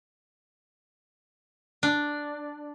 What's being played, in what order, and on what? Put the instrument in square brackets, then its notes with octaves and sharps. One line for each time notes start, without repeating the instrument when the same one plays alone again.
[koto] D4